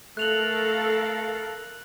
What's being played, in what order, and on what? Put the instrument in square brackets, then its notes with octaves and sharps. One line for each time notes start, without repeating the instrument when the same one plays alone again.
[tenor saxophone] A3 [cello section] A4 A#4 F5 [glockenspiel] F#6 F7 F#7